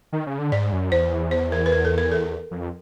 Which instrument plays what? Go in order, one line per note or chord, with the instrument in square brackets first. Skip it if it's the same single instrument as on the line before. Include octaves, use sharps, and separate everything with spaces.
[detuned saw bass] D#3
C#3
D3
[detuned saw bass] G#2 [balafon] D5
[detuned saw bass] F#2
[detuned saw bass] E2 [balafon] C5
[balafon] C5
A#4
B4
A#4
A4
A#4
A4
[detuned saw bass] F2